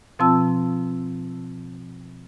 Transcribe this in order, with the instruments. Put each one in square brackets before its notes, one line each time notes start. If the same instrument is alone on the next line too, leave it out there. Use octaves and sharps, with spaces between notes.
[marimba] B2 F3 C4 F4 A5 E6